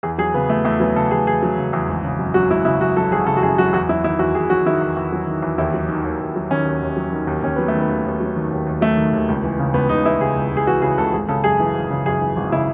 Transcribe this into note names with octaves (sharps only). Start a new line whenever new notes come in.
E2 G#4
F#3 G#4
C#3 B3
E2 A3
E2 A3
F#3 B3
C#3 A4
E2 G#4
E2 G#4
F#3
C#3
E2
G#1
C#3
F#2
F#3 F#4
G#1 E4
C#3 E4
F#2 F#4
F#3 A4
G#1 G#4
C#3 A4
F#4
F#2 G#4
F#3 F#4
E2 F#4
F#3 E4
D#3 E4
E2 F#4
E2 G#4
F#3 F#4
D#3 E4
E2
E2
F#3
D#3
E2
D#2 E4
F#3
D#3
D#2
D#2
F#3
D#3 C#4
D#2
D#2
F#3
D#3
D#2
D#2 C#4
F#3 B3
A3
D#3
B3
D#2
D#2
F#3
D#3
D#2
D#2
F#3 A3
D#3
D#2
C#2
E3
C#3
C#2 B3
C#2 D#4
E3 E4
C#3 G#4
C#2
C#2
G#4
E3 F#4
C#3 G#4
C#2 A4
G#1 G#4
C#3 A4
F#2 G#4
E3
G#1
C#3
F#2 G#4
E3
G#1
C#3 E4